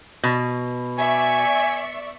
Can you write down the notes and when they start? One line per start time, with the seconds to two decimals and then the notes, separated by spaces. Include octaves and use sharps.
0.24 B2
0.98 D5 E5 G#5 C#6